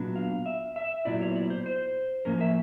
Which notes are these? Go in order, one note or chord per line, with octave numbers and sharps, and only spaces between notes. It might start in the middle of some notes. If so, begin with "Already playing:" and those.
Already playing: A#2 F#3 B3 D4
F5
E5
E5
A#2 F#3 B3 E4 D5
C#5
D5
C5
C5
A2 F3 A#3 C#4 A#4
E5